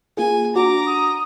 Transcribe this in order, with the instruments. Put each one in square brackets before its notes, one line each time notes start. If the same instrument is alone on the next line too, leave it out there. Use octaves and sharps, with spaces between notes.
[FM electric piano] A#3 F4 G#4 [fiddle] G#5
[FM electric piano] D4 F#4 [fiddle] A#5 [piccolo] D6
[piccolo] D#6